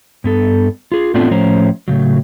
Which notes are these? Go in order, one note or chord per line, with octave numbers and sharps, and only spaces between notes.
G2 B3 A4
F4 G#4
A2 A3 B3 C4 D4 F4
A2 F3 C#4 C5 C#5 A#5
A2 C#3 F#3